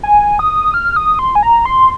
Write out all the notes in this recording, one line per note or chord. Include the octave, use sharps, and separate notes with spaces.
G#5
D#6
F6
D#6
C6
G#5
A#5
C6